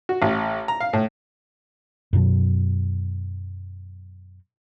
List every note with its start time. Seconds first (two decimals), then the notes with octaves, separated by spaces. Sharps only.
0.09 F#4
0.22 A1
0.68 A#5
0.80 F5
0.93 A2
2.13 F#2 B2 F#3